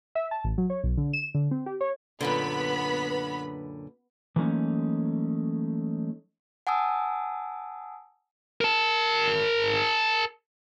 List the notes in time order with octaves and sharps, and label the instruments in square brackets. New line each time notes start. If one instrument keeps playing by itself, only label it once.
[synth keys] E5
A5
A1
F#3
C#5
B1
D3
E7
D3
C4
G4
C#5
[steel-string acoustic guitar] F#2 A#2 D3 [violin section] B3 B5
[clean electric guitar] E3 F#3 A3 A#3 C#4 D#4
[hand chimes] F#5 G#5 A5 D#6 E6
[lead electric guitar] A#4 A5